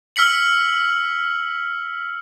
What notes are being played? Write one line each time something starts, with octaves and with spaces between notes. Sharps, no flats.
E6 F6 B6 C#7 F#7